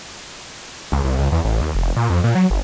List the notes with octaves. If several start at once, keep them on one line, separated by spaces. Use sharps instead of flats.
C#2
C2
C#2
E2
A1
D#2
F1
A#2
F2
A#2
F#3
G1